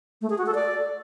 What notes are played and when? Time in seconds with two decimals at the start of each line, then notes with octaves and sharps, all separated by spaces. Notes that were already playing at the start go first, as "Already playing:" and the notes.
0.22 A3
0.30 G#4
0.38 F#4
0.46 A4
0.55 D5